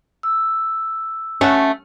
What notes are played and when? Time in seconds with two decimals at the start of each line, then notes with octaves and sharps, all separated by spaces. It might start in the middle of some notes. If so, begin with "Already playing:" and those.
0.23 E6
1.41 A3 C#4 F#4